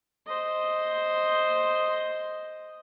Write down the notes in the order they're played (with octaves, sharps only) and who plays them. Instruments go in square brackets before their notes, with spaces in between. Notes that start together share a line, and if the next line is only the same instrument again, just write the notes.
[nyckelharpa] C5 D#5